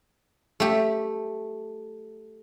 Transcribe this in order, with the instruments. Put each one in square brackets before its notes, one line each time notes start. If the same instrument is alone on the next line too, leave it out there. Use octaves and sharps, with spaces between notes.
[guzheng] A3 G4